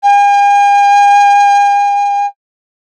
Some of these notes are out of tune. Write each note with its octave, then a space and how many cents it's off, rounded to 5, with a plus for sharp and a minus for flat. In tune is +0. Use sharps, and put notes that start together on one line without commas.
G#5 -45